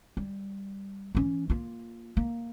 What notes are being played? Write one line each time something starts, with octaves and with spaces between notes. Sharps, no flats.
G3
E3 C#4
A#3 F4
A#3